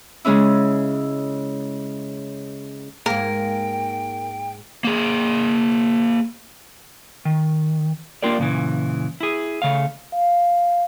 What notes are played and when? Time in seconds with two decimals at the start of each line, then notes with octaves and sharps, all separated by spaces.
0.25 C#3 G#3 C#4 E4
3.06 G#2 A#3 A#4 G5
4.84 A#3 G#4
7.25 D#3
8.23 A#3 D4 F4 G4 A#4 D5
8.38 F#2 A#2 C#3 E3
9.21 E4 G#4
9.62 C#3 A3 F5
10.12 F5